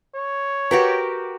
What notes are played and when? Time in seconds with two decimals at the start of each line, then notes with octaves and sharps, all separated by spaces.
0.15 C#5
0.71 F#4 G4 A#4 B4